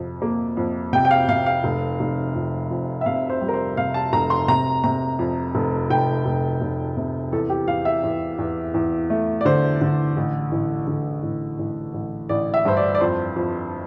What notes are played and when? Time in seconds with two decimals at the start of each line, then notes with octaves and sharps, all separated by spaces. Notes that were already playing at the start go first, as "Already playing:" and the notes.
Already playing: F2 C3
0.22 A#3
0.57 F2
0.93 C3 G5
1.05 G5
1.11 F5
1.28 C3 F5
1.46 F5
1.64 F1
2.00 F1
2.35 F2
2.71 F2
3.01 E5
3.06 C3 F5
3.29 C5
3.41 G3
3.48 A#4
3.54 C5
3.77 C3 F5
3.94 A5
4.13 F1 A#5
4.30 C6
4.48 C3 A#5
4.84 C3 A#5
5.19 F2
5.55 F1
5.90 F1 G5
6.26 F1
6.61 F1
6.97 C3
7.32 E2 A4
7.50 G4
7.68 E2 F5
7.85 E5
8.03 E2
8.39 E2
8.74 E2
9.10 A3
9.41 D5
9.45 D3 C5
9.81 D3
10.17 A1
10.52 A1
10.87 D3
11.23 A1
11.59 A1
11.94 A1
12.29 A1 D5
12.54 E5
12.65 G2 C5
12.77 D5
12.95 D5
13.01 F2 C5
13.36 F2